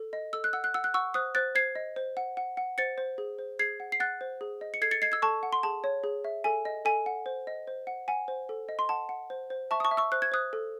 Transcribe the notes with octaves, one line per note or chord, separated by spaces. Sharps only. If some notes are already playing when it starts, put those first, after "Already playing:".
Already playing: A4
D#5
A4 E6
F#6
F#5 E6
F#6
F#5 E6
F#6
F#5 C#6 E6
C5 D#6 F#6
C5 F#6 A6
C5 G#6 C7
D#5
C5
F#5
F#5
F#5
C5 A6 C#7
C5
G#4
C5
G#4 G#6 C7
F#5
C7
F#5 F#6 A6
C5
G#4
D#5
C#7
A4 G#6 C7
A6 C#7
D#5 G#6 C7
E6 G#6
A4 A5 C#6
F#5
C6
G#4 A5
C#5
G#4
E5
A4 G#5
D#5
A4 G#5
F#5
C5
D#5
C5
F#5
F#5 G#5
C5
A4
D#5
C6
F#5 A5
F#5
C5
C5
E5 A5 C#6
D#6
A5 C#6
E5
C#6 E6
C5 F#6
G#6
C5 D#6 F#6
A4